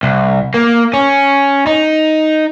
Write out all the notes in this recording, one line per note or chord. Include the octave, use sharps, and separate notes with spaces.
C2
A#3
C#4
D#4